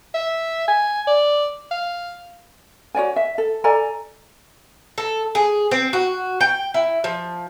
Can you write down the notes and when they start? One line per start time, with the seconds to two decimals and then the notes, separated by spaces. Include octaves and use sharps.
0.14 E5
0.68 G#5
1.07 D5
1.71 F5
2.95 F#4 C#5 D5 G#5
3.16 E5
3.38 A4
3.64 A4 D5 G#5 A#5
4.98 A4
5.35 G#4
5.71 C4
5.93 F#4
6.41 G5
6.74 E4
7.04 F3